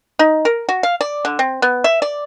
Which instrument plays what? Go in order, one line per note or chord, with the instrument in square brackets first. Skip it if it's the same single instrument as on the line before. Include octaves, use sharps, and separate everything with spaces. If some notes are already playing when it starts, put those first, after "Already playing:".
[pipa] D#4
A#4
F#4
F5
D5
D3
C4
B3
E5
D5